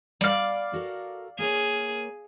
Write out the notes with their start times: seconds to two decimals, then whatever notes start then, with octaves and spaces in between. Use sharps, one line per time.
0.21 G3 D5 F5 F#5
0.73 F#4 A4 A#4
1.39 A#3 G#4 A#4 C#5